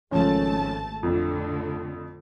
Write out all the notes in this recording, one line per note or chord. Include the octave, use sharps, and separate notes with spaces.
G#1 C#3 F3 A3 C#4 A5
F2 A2 D3